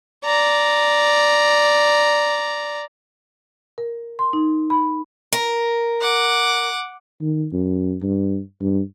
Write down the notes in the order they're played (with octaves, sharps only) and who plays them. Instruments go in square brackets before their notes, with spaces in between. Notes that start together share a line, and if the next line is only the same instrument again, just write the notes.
[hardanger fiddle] D5 A#5
[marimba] A#4
C6
D#4
B5
[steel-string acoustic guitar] A#4
[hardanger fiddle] F#5 D6
[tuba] D#3
F#2
G2
G2